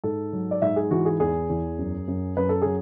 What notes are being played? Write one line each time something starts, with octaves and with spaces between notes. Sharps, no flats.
G#2 A4
F#3
D5
G#2 E5
G#4
E3 F#4
G#4
E2 G#4
E2
F#2
F#2
F#2 B4
A4
F#3 G#4